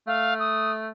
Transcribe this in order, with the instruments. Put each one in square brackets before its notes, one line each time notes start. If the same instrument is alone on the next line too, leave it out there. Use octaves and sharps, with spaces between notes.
[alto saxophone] A3 [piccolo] F5
[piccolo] D#6